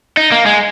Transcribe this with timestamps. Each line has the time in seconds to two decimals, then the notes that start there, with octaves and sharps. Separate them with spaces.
0.17 D#4
0.32 A#3
0.46 G#3